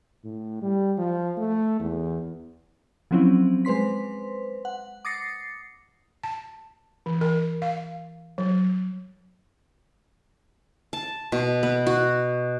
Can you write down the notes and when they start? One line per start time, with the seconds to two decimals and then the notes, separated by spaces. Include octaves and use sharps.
0.24 A2
0.62 G3
0.98 F3
1.37 A3
1.80 E2
3.11 F3 F#3 C4 C#4 E4
3.65 G#3 B4 C5 C6 B6
4.65 F#5
5.05 D6 D#6 A6 A#6 C7 C#7
6.24 A5
7.06 E3
7.21 A#4
7.62 F5
8.38 F#3
10.93 A5
11.32 B2
11.63 B3
11.87 F#4